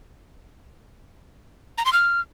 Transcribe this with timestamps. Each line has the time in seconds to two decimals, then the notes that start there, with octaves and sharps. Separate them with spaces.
1.78 A#5
1.85 C6
1.93 F6